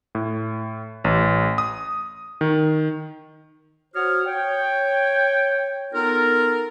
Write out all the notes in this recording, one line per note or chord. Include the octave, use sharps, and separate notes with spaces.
A2
A1
D#6
D#3
F#4 C5 C#5 F#5 D#6 F6
C#5 G5
B3 D#4 F4 A4 A#4